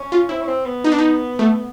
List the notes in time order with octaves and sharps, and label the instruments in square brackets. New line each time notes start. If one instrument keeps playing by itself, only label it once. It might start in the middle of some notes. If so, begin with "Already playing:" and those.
Already playing: [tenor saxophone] C#4
[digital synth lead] F4
[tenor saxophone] C4 [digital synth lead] E4
[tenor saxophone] C#4
C4
B3
[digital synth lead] D#4
D4
D#4
A3